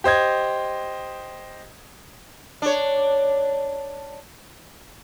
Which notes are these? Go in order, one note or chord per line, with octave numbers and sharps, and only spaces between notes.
G4 C5 D#5 G#6
D4 C#5